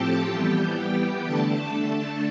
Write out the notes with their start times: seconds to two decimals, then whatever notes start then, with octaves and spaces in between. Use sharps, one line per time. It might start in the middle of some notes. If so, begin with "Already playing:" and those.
Already playing: A2 F3 C4 G4 A4 G5 A5
0.31 E3 G3 B3 G4 G5
0.78 G4 G5
1.25 D3 A3 D4 A4 A5